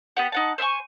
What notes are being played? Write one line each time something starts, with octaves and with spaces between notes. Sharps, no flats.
B3 G4 F#5
D#4 F#5 A5
C5 E5 G#5 C#6